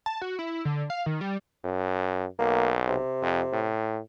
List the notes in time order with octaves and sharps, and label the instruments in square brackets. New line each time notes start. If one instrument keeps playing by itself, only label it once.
[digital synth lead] A5
F#4
E4
D3
F5
D#3
G3
[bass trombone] F#2
[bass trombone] B1 [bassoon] A#3
[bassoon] C3
[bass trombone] F2
A2